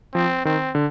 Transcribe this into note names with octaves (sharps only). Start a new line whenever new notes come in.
F3 C4
D#3 C4
D3